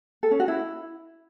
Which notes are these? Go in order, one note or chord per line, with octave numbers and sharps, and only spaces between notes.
A4
C#4
F#4
E4